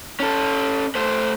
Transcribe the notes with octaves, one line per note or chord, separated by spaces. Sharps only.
C#4 A4
A3 C5